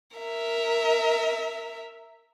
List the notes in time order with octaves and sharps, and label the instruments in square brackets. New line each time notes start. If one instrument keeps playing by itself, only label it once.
[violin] A#4 E5